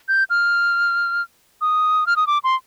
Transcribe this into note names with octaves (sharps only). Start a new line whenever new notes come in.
G6
F6
D#6
F6
D#6
D6
C6